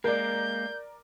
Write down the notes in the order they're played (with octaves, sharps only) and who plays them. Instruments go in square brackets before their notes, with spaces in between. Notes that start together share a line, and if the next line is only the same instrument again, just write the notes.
[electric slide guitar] G#3 A#3 [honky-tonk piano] A#4 D5 [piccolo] G6